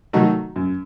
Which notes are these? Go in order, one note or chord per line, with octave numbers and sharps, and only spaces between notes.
D#3 F#3 A3 D#4 F#4
F#2